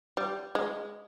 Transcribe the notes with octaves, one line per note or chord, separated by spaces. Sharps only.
G3
G#3